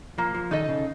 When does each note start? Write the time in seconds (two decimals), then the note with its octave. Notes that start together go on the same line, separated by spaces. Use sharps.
0.18 F3 A#3
0.35 F3
0.51 D#3 D#4 A4 D#5
0.69 C#3